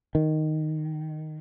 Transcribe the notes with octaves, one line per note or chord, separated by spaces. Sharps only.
D#3